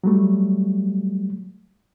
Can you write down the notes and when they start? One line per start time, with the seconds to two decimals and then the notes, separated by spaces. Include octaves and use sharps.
0.04 F#3 G3 A3